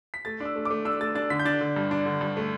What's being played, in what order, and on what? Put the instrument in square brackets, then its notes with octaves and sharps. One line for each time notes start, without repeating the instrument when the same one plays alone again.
[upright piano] B6
A3 A6
D4 E6
A3
D6
A3
D4 E6
A3 A6
D4 A6
D3 B6
G6
D4 A6
D3
G2
D4
D3
G2
A3